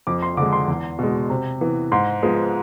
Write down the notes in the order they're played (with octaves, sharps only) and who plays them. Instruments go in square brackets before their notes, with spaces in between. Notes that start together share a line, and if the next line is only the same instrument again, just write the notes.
[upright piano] F2 D6
C6
D3 D6
G#3
C6
E2
B2 G#3
C3
E3 B3
G#2 C6
F3 G#3 B3